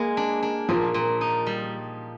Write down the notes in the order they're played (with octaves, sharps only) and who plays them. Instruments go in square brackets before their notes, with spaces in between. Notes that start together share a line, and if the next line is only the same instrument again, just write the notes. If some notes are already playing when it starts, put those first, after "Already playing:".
Already playing: [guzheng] G#3 [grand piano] A#3
[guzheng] D4
D4
[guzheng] A#2 [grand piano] F3
[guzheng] A#2
D#4
G3